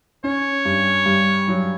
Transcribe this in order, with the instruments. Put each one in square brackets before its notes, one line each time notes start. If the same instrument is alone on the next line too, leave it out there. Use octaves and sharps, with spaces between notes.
[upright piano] C#4 [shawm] C#5
[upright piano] G2
G2
F#3